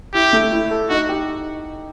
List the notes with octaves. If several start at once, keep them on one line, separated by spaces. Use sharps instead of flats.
E4 G4
A3
E4
A4
D#4 F#4
G4